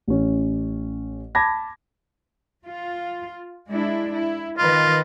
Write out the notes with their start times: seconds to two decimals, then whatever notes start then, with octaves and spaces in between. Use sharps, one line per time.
0.08 A1 C#4
1.35 A5 B5 D6 G#6 A#6
2.66 F4
3.69 G#3 D4 E4
4.14 E4
4.58 D#3 F4 B4 D#5